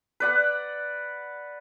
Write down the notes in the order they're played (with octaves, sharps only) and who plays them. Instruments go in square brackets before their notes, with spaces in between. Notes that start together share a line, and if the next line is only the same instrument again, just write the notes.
[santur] B4 D5 F#5